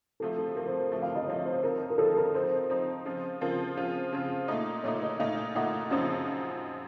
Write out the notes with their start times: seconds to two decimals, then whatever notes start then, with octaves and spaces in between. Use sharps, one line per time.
0.20 C3 F3 A3 A4
0.38 A4
0.55 C3 F3 A3 A#4
0.66 C5
0.78 A#4
0.92 C3 F3 A3
1.02 F5
1.15 D#5
1.27 C3 F3 A3 C#5
1.46 C5
1.63 F3 C4 D#4 A#4
1.90 A#4
1.98 F3 C4 D#4 A4
2.16 A#4
2.34 F3 C4 D#4 C5
2.69 F3 C4 D#4
3.05 C#3 F3 C4 F4
3.41 C#3 F3 C4 F4 A#4
3.77 C#3 F3 C4 F4
4.13 C#3 F3 C4 F4
4.48 A#2 A3 D#4
4.83 A#2 A3 D#4 C#5
5.02 D#5
5.20 A#2 A3 D#4 F5
5.55 A#2 A3 D#4 F#5
5.91 F#2 C#3 F3 C4 D#4